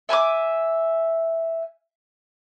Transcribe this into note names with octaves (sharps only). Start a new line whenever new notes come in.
E5 G#5 A#5 D6